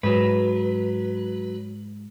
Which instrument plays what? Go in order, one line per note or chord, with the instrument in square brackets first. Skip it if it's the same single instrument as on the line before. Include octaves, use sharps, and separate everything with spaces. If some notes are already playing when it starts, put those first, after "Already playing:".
[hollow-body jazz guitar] G#2 [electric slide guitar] F#3 B4